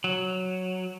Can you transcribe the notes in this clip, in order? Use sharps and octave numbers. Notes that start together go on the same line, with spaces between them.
F#3